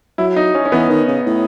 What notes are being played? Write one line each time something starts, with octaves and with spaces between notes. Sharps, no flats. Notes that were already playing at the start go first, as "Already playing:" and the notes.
F#3 E4
D#4
C#4
C#4
E3 B3
D#3
C#3
A2